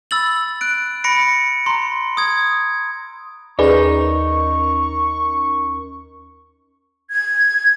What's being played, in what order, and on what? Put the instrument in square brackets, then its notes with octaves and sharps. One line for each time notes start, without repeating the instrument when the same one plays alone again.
[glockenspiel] B5 E6 A6 F#7
F#6 D7
B5 A#6 C#7 D7
A#5 C6
D#6 G#6
[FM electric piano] D#2 C#4 A#4 [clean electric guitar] D#4 [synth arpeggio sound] G#4 B4 D5 [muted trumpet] C#6
[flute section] G#6